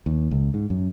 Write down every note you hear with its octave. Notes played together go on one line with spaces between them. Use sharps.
D#2
C#2
G#2
F#2